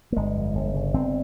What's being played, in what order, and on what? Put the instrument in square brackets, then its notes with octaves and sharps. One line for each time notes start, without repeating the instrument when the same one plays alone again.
[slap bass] A#3
G1 G#3
F2
G1
C#3
G1 C4